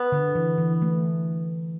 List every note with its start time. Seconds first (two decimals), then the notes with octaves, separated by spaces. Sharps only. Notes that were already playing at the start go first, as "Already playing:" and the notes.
Already playing: B3
0.12 D3
0.35 E3
0.58 E3
0.82 A3